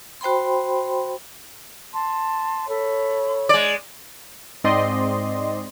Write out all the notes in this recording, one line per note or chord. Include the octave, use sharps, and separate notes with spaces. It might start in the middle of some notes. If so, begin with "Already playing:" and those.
F#4 C5 G5 B5 C6
A5 C6
A4 C#5 B5
G#3 D5
G#2 C4 D5 D#5 C6